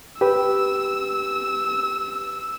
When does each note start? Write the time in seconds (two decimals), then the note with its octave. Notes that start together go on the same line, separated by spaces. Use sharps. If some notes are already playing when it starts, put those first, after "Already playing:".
0.21 G4 B4 E6